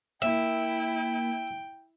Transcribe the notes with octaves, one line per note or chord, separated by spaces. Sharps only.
A#3 E4 E5 G5